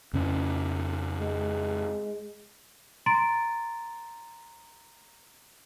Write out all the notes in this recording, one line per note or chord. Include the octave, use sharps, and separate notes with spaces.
F2 C#3 C#4
G#3
A#5 C6 A6 D7